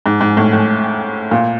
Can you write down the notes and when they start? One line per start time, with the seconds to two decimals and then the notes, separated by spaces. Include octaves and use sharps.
0.06 G#2
0.21 G#2
0.37 A2
0.53 A2
1.31 A#2